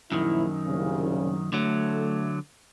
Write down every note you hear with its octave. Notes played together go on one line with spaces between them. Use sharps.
A#1 F#2 D#3 E4
F#1 C2 C#3
D3 F#3 A3